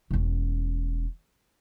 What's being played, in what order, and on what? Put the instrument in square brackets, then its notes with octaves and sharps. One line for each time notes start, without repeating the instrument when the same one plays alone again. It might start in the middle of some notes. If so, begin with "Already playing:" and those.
[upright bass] E1 C#4